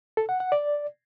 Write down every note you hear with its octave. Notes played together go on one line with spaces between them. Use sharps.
A4
F#5
F#5
D5